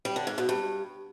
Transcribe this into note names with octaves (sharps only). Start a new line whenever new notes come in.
G3
D3
G#2
B2
G2